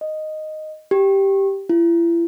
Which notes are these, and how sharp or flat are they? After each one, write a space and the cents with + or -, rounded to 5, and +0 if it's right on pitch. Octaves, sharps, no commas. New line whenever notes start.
D#5 -5
G4 -5
E4 +40